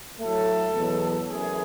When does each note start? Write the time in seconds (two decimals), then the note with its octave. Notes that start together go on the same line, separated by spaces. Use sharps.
0.20 A2 F#3 A3 A4
0.74 E2 B2 F#3
1.29 F#2 E3 A3 G#4